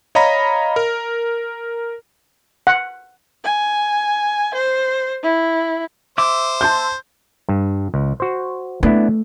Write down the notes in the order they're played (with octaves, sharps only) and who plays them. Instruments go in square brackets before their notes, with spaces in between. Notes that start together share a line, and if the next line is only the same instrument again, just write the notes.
[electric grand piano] C#5 D#5 F5 A#5 B5 A#6
A#4
[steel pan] F#5
[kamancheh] G#5
C5
E4
[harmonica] C5 [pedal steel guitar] E5 D6
[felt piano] A5 C6 G6
[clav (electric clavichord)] G2
C#2
F#4 C5
[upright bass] A3 [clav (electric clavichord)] B3 D4 E4